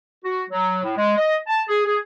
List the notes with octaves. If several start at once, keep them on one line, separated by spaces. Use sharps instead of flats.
F#4
F#3
A2
G#3
D#5
A5
G#4
G#4